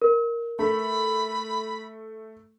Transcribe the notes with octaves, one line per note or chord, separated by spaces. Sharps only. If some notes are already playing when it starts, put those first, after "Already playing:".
A#4
A3 B5